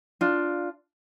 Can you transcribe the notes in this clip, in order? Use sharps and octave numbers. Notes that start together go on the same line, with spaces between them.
D4 F4